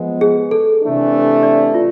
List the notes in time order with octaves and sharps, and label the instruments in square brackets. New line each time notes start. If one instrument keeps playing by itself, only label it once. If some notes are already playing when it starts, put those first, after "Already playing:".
Already playing: [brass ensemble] F3 G#3 B3
[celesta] G#4
A4
[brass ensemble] C3 E3 A3 D4 A4
[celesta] D5
F4